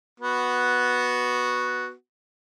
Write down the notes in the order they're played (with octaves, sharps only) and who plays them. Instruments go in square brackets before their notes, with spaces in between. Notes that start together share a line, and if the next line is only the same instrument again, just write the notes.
[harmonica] B3 F#4